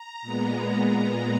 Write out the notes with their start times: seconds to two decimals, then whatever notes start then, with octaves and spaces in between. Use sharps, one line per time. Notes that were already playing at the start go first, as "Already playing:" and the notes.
Already playing: A#5
0.22 A#2 G#3 B3